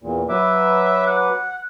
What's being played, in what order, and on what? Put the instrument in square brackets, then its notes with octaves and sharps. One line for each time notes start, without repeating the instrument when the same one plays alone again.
[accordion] E2 A#2
[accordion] F#3 B4 D6 [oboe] E5
[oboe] F#5